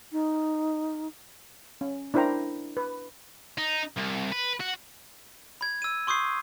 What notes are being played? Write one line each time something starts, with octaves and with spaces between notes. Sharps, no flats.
D#4
C#4
D4 E4 A#4 C5 G5 A#5
B4
D#4
C2
B4
F#4
B5 G#6
E6 D#7
C6 C#6 D#6 G6 C7